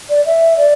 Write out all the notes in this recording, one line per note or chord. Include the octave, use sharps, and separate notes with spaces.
D5
E5
D5